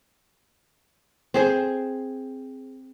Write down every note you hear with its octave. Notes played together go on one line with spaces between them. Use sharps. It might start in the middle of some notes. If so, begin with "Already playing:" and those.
C4 G#4 C5